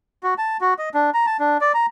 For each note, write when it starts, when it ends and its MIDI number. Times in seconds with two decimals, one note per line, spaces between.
0.23 0.34 66
0.38 0.57 81
0.61 0.74 66
0.79 0.89 75
0.94 1.10 62
1.14 1.26 82
1.26 1.37 81
1.40 1.58 62
1.61 1.72 74
1.74 1.86 82